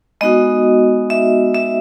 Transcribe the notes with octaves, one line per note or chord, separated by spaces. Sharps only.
G#3 B3 D#4 F#4 D#5
E5
E5